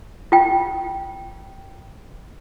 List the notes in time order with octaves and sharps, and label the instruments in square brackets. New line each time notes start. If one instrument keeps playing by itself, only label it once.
[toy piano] F4 G5